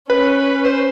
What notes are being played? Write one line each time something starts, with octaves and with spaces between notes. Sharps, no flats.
C#4 B4
C5